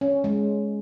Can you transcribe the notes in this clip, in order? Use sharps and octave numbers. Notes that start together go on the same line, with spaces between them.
C#4
G#3